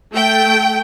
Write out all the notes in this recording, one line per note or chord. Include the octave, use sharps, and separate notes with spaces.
A3 G5